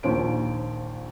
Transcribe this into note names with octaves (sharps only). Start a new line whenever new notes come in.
A#1 D#2 C5 D7